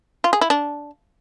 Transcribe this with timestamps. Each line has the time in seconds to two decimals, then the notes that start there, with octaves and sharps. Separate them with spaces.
0.24 F4
0.33 G#4
0.41 E4
0.50 D4